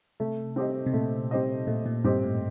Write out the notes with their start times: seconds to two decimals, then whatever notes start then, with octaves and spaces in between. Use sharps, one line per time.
0.20 C3 A3
0.56 C4 G4 C5 D#5
0.87 C3
0.93 A#2 A3
1.31 C4 G4 C5 D#5
1.67 A#2 A3
1.86 A#2
2.04 G2 C4 G4 C5 D#5
2.23 A2